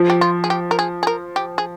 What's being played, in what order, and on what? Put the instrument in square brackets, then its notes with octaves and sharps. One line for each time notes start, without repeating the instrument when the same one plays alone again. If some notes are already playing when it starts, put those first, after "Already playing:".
Already playing: [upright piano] F3
[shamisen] G4
F4
G#4
G4
A#4
G#4
G#4
A#4
G4
G#4